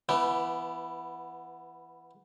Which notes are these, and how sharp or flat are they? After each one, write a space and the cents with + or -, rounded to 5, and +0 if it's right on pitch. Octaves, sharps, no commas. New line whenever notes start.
E3 +20 B3 +0